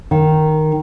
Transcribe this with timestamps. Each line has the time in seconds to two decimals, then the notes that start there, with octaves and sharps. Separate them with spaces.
0.11 D#3